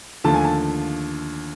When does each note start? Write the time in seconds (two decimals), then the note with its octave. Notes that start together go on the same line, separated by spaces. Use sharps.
0.24 D#2 D3 F3 A3 A5
0.34 G#5
0.45 A5